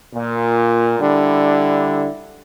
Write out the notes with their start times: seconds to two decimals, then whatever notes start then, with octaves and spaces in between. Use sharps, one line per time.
0.14 A#2
1.00 D3 G3 D4 E4